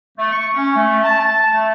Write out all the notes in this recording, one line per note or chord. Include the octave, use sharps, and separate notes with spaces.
A3
C#6
C#4
A3
A5
A5
A3